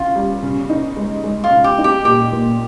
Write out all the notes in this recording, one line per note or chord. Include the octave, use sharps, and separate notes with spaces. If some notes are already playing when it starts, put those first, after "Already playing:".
Already playing: C#3 F4
G3
C#3
D#4
G#3
G#3
F4
C#3
G4
D#4
G4
A#2 G4
A#2